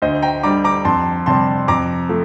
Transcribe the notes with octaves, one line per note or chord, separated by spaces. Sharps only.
D2 C5 D#5
G5 A#5
D3 G3 A#5 D6
A#5 D6
F2 A5 C6
C3 G3 A5 C6
F2 A#5 D6
F3 A3